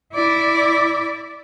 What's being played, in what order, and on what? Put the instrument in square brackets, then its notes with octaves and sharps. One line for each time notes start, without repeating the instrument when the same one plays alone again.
[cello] E4 D5